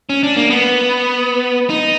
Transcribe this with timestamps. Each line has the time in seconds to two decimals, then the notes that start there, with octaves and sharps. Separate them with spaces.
0.10 C#4
0.23 D4
0.37 A#3
0.50 B3
1.70 D#4